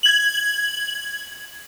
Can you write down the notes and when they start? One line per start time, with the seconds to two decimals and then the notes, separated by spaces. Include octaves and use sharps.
0.03 G#6 F#7